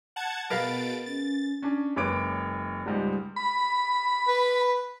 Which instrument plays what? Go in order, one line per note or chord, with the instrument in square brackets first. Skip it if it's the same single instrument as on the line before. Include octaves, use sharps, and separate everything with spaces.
[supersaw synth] F#5 A5 G#6
[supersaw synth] B2 A6 D7 [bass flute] G#4 [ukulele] A#4 B4 F5
[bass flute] C#4 [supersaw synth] A6
[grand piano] C#4 D4
F#1 G#3 B4 C#5 D6 D7
C#2 G#2 G3 G#3
[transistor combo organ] B5
[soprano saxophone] B4